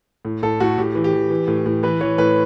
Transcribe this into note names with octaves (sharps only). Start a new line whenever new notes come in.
A2
A2 A4
A2 F#4
A2 G4
E3
G4
E3
E3
A2
A2
E3 B4
E3 C#5
A2 B4